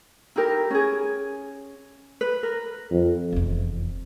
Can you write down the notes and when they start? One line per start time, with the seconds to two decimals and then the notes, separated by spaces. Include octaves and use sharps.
0.36 D#4 E4 G4 A#4
0.70 C#4 G#4
2.21 B4
2.43 A#4
2.91 F2
3.32 F1 E2